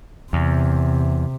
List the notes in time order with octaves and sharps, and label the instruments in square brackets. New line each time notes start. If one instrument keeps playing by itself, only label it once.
[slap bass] E2 [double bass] C3